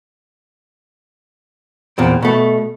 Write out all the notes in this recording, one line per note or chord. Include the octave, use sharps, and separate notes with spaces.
E2 A#2 C4
B2 A3